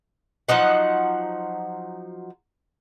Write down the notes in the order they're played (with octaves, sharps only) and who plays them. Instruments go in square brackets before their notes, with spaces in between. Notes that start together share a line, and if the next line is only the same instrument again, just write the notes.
[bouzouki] F3 F#3 D#4 F#5